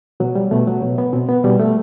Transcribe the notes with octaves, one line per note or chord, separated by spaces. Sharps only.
B2 F#3
G3
B2 A3
F#3
B2
B3
B2 C4
B3
B2 G3
A3